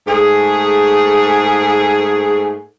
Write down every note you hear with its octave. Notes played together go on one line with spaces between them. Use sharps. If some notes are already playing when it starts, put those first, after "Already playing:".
G#2 A3 G#4